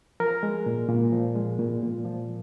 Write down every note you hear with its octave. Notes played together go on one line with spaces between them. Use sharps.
F3 A#4
G#3
A#2
A#2
F3
G#3
A#2
A#2
F3